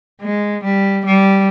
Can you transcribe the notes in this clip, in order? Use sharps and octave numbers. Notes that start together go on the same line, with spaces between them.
G#3
G3
G3